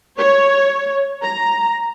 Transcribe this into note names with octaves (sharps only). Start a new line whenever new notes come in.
C#5
A#5